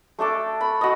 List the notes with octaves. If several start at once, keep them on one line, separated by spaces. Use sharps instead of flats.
A3 D4 A4 D6
B5
F#4 D#5